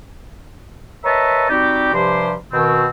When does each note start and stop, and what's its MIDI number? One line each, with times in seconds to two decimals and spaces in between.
1.05 1.49 70
1.05 1.49 71
1.05 1.49 73
1.05 1.49 75
1.05 1.49 76
1.05 1.49 81
1.50 1.92 55
1.50 1.92 60
1.50 1.92 63
1.50 1.92 66
1.50 1.92 67
1.94 2.32 43
1.94 2.32 48
1.94 2.32 53
1.94 2.32 67
1.94 2.32 72
1.94 2.32 84
2.52 2.87 47
2.52 2.87 51
2.52 2.87 60